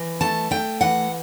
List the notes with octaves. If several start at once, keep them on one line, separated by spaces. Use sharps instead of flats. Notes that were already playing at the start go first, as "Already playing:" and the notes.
Already playing: E3
A3 A5
A3 G5
E3 F#5